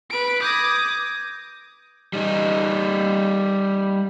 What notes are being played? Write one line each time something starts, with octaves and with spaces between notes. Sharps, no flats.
B4 D7
D6 D#6 G6 G#6 A#6
G3 D#4